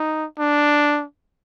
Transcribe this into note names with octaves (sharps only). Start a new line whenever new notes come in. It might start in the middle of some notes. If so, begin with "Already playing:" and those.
Already playing: D#4
D4